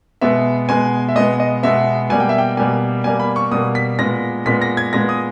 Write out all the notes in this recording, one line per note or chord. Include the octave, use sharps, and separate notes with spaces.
B2 G#3 B3 E5
B2 G#3 B3 G#5
E5
B2 G#3 B3 D#5
D#5
B2 G#3 B3 E5
B2 G3 A#3 G#5
G5
E5
G5
B2 G3 A#3 G#5
B2 G3 A#3 G#5
B5
C#6
B2 G3 A#3 D#6
B6
A#2 G#3 B3 A#6
A#2 G#3 B3 B6
A#6
G#6
A#2 G#3 B3 A#6
D#6